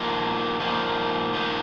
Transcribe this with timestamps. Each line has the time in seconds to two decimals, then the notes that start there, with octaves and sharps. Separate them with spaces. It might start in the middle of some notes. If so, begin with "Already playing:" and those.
Already playing: F3 A#3 D#4
0.60 F3 A#3 D#4
1.33 F3 A#3 D#4